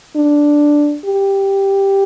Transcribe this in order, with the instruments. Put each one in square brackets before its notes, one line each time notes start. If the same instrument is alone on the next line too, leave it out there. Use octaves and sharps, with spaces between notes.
[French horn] D4
G4